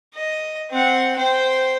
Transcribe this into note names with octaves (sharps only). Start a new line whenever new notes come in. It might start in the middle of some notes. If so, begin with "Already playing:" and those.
D#5
C4 F#5
C5 G5